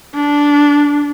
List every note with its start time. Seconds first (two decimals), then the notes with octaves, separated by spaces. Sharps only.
0.15 D4